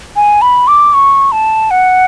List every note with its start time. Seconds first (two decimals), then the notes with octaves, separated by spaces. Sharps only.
0.16 G#5
0.42 B5
0.68 D6
0.94 C#6
1.32 A5
1.71 F#5